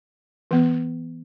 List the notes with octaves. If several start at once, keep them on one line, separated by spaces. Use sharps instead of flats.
E3 B3